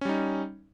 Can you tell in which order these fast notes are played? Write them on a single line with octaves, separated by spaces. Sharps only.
C#4 G3 D#4